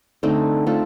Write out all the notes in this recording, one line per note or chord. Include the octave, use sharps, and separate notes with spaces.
D3 A3 C4 D#4
A3 C4 F4 A4